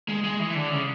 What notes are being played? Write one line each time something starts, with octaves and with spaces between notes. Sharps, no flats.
G#3
G#3
E3
D3
C#3